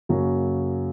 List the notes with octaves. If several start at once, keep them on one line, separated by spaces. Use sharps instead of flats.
F#2 C#3 F#3 A#3